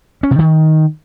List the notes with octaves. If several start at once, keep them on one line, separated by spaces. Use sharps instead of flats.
C#4
C3
D#3